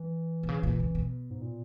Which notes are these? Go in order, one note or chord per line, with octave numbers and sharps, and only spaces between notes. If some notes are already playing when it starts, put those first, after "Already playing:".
Already playing: E3
B2
C#3
A#2
C#3
B2
G#2
A#2